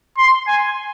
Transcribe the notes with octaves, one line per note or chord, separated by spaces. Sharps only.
C6
G#5